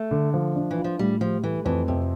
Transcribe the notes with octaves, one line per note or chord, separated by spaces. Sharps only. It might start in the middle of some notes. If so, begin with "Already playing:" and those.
Already playing: A3
D3
F3
D4
E3
F4
F3
A2 G3
F3 G3
E3 A3
F2 E3
F2 C3